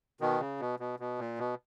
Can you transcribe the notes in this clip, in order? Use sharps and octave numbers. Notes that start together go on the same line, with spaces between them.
B2 D#3
C#3
B2
B2
B2
A#2
B2